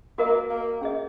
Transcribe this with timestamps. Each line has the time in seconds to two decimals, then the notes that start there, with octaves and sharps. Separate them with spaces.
0.18 A#3 F#4 A#4 D#5
0.50 A#3
0.81 C#4 G#4 D#5